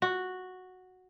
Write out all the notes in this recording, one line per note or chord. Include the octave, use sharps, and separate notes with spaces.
F#4